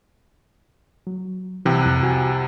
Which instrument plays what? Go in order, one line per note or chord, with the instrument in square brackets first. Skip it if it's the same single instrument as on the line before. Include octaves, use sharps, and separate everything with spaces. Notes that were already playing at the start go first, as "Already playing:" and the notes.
[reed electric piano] F#3
[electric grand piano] C2 C3 [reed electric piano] E3 G5 E6
[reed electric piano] F2 F#6
F#4 G#5